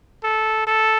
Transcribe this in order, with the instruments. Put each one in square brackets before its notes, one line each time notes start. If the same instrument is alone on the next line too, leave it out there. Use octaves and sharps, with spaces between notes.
[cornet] A4
A4